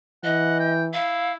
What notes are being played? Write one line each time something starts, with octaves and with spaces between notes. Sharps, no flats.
E3 D#5 F#5
G5
E4 F5